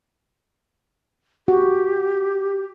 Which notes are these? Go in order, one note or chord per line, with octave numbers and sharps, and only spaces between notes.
F#4 G4